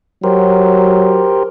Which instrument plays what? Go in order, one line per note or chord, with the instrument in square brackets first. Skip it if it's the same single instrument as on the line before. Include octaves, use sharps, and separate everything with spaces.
[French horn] F#3 [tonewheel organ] G4 A#4 C5